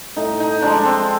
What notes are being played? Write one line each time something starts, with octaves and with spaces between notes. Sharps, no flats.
A2 D#4
D#4
F3 G#3 D4
C4